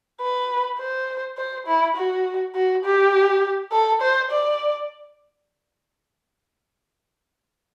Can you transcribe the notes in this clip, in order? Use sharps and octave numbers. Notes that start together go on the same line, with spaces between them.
B4
C5
C5
E4
F#4
F#4
G4
A4
C5
D5